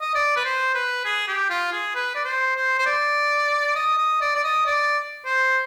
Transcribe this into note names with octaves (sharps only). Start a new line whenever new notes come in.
D#5
D5
B4
C5
B4
G#4
G4
F4
G#4
B4
D5
C5
C5
C5
D5
D#5
D#5
D5
D5
D#5
D5
C5